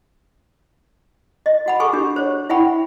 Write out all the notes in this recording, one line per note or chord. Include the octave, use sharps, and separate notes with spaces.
D#5
F#4 F#5 B5
G#4 A4 G#5 C#6
D4 F#4 G4
C5 C#5
E4 E5 F#5 G5 B5 C#6